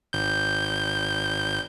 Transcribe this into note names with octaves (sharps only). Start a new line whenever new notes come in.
G#1 G6